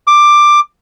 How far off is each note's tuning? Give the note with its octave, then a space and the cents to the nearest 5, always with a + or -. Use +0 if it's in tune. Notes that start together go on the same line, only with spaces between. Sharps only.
D6 +10